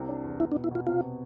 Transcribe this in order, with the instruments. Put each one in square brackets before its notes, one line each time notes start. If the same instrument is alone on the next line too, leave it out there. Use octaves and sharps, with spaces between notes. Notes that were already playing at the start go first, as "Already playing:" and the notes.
Already playing: [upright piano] C2 C3
D4
E2
[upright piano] B3 [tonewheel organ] E4
[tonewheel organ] D4
[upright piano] B2
[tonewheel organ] E4
[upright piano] B2 [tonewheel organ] F4
[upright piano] C3 [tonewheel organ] F4
[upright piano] B3